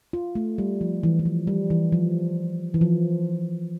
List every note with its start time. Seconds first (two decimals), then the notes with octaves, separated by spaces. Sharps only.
0.13 F4
0.35 A3
0.58 G3
0.81 F3
1.03 E3
1.19 E3
1.26 F3
1.47 G3
1.70 E3
1.92 F3
2.74 E3
2.81 F3